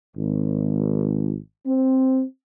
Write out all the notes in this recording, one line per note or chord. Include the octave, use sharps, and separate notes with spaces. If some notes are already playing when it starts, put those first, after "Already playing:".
G#1
C4